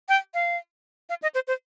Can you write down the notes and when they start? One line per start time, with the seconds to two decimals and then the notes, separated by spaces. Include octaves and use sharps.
0.09 G5
0.34 F5
1.09 F5
1.22 D#5
1.35 C5
1.47 C5